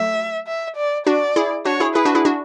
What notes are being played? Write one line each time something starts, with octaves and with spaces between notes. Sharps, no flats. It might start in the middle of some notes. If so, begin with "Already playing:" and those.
Already playing: F#3 A3 E5
E5
D5
D4 F#4 D5
E4 G#4
D4 F#4 C#5
E4 G#4
E4 G#4 B4
D4 F#4
E4 G#4
D4 F#4